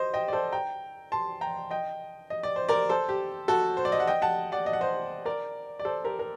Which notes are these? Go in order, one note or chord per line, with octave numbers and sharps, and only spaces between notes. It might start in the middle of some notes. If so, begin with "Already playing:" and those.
Already playing: C5 D#5
D#5 G5
D5
A4 C5
G5 A#5
A5 C6
G5 A#5
D#5 G5
D#5
D5
C5
A#4 D5
A4 C5
G4
F#4 A4
C5
D5
D#5
F#5
D#5 G5
F#5 A5
D5 F#5
D#5
F#5
C5 D#5
A#4 D5
D5
A4 C5
G4 A#4
A#4